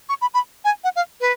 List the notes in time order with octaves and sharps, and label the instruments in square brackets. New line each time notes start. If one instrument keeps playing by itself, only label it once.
[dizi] C#6
B5
B5
G#5
F#5
F5
B4